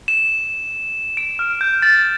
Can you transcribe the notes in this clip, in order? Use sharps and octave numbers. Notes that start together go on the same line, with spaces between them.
E7
D7
F6
G6
A6